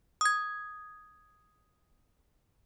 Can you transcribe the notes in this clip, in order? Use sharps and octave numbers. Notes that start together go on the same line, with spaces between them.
D#6 G#6